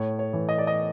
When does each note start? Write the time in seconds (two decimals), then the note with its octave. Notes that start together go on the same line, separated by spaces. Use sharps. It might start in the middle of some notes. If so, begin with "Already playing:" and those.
Already playing: A2 C#5
0.19 C#5
0.33 E3
0.49 D#5
0.58 D5
0.67 D#5